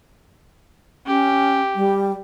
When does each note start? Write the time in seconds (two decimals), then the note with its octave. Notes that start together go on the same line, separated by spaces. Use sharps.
1.07 C#4 G4
1.75 G3